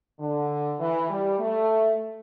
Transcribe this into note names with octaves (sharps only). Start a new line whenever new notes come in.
D3
E3
G3
A3